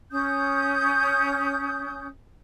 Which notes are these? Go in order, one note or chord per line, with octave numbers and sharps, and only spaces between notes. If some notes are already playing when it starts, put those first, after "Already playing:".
C#4 D#6 G6